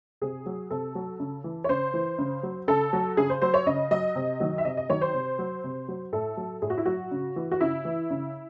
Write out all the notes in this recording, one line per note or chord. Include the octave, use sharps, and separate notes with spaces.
C3 G#4
F#3
C3 A4
F#3
C#3
E3
C#5
C#3 C5
E3
C#3
F#3
C#3 A4
F#3
C#3 G#4
C5
F#3 C5
C#5
C#3 D#5
F#3 D#5
C3
D#3 F#3
E5
C3 D#5
D#5
D#3 F#3 C#5
C5
C3
F#3
C3
F#3
A2 A4
F#3
A2 G#4
F#4
E4
F#3 F#4
C#3
E3
F#4
C#3 E4
E3
C#3